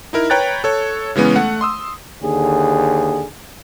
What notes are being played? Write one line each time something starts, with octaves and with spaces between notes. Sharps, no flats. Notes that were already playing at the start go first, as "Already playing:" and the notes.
D#4 E4 A#4
B4 C#5 G5 A#5 F#6 A6
A4 C#5
C#3 E3 G#3 B3 C#4
A3 F#5
C6 D#6 E6
D#2 D3 G#4